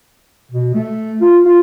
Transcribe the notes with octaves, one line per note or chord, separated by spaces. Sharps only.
B2
A3
F4
F4